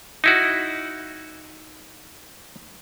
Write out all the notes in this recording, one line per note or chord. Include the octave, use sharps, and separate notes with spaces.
D#4 E4 F#4